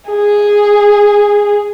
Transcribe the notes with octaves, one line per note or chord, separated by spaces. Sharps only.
G#4